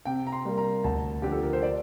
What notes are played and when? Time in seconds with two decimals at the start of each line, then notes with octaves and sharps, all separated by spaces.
0.05 C3 G5
0.27 A#5
0.32 C6
0.45 G3 A#3
0.58 A#5
0.84 D2 A5
1.22 D3 F3 G4
1.32 A4
1.43 A#4
1.53 C5
1.63 D5